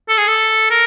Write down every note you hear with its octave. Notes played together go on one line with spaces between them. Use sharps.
A4
G#4
A4
A#4